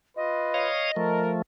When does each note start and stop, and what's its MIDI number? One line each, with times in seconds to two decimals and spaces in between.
0.16 0.69 65
0.16 0.69 71
0.16 1.21 75
0.54 0.91 73
0.54 0.91 77
0.54 0.91 87
0.96 1.42 53
0.96 1.42 57
0.96 1.33 70